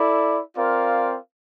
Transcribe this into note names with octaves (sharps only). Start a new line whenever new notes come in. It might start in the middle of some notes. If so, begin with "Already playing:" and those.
Already playing: E4 A4 D5
C4 F4 A#4 D5 F5